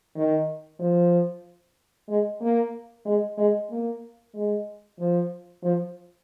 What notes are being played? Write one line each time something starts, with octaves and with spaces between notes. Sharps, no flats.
D#3
F3
G#3
A#3
G#3
G#3
A#3
G#3
F3
F3